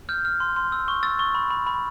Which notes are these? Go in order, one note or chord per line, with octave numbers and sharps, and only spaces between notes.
F6 G6
F6
C6
C6
E6
C#6
E6 A6
C#6
B5
B5
B5